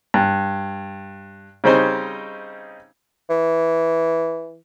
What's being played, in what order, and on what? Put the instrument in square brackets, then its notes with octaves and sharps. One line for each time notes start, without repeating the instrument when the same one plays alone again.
[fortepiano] G2
C#3 G3 C4 C#4 D#4 C5
[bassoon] E3